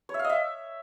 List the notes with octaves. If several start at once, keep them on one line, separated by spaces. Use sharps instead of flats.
C#5
E5
F5
D#5
E5